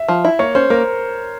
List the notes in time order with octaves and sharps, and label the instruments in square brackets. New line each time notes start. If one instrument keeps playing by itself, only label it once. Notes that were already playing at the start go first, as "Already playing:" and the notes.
Already playing: [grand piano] E5
[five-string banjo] F3
E4
[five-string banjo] A#3 [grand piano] C#5
[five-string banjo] C#4 [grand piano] C5
[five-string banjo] A#3 [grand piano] A#4